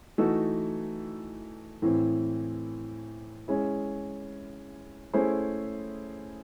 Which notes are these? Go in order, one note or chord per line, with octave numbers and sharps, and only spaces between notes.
E3 A3 D#4 F#4 A4
A2 E3 C4
G#3 C#4 E4
A3 C#4 E4 G#4 C5